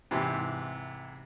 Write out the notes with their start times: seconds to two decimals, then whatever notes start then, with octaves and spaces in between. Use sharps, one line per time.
0.11 G#2 C3 E3 G4